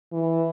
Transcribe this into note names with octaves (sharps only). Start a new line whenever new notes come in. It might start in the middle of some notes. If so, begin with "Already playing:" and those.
E3